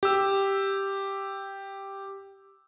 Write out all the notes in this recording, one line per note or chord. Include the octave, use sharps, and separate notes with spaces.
G4 E6